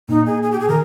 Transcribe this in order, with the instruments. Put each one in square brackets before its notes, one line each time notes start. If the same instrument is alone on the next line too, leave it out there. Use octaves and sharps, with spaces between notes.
[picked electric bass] A#2 [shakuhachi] D#4
[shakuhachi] G#4
G#4
G4
G#4
[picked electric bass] D#3 [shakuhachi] A#4